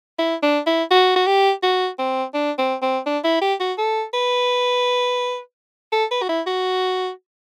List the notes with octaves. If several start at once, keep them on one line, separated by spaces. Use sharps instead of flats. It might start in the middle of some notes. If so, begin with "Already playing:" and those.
E4
D4
E4
F#4
F#4
G4
F#4
C4
D4
C4
C4
D4
E4
G4
F#4
A4
B4
A4
B4
F#4
E4
F#4